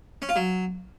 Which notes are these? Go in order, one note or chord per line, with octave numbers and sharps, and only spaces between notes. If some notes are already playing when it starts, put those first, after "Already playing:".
C#4
F4
F#3